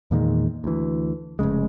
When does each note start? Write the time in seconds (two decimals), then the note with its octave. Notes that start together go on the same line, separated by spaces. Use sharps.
0.11 E2 A#2 D#3 G#3
0.64 D2 E3
1.39 F1 D#2 C#3 G#3